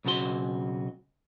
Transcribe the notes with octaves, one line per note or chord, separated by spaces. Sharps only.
B1 C#3 F#4 A#4 C6